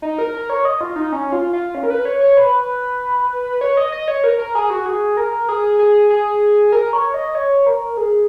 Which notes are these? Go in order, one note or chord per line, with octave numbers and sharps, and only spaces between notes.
D#4
A#4
A#4
C#5
D#5
F4
D#4
C#4
F4
F4
C#4
A#4
B4
C#5
C#5
B4
C#5
D#5
D#5
C#5
A#4
A#4
G#4
F#4
G#4
A#4
G#4
G#4
G#4
A#4
C#5
D#5
C#5
A#4
G#4